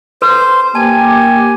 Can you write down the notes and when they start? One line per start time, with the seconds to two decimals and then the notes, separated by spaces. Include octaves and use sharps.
0.22 A4 B4 C5
0.75 A#3 G4 G#5 A5